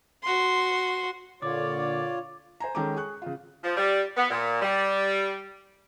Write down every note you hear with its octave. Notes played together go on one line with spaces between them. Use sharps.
F#4 C6
A#2 D3 F4 C#5 D5 D6
C5 G#5 A#5
D#3 G#3 C#4 A4 A#5 D6
G#4 C#6 F#6
C#3 F4
F3
G3
B3
A#2
G3